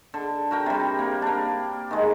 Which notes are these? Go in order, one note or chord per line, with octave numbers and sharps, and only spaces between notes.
D3
F#4 A#4 G5
C3 G3
A#3
A#3 D4
D#3 G#3